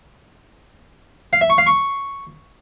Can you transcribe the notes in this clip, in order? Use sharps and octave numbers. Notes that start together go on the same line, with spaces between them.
F5
E5
C#6
F5
C#6